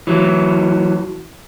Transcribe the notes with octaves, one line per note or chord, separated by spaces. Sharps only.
E3 F#3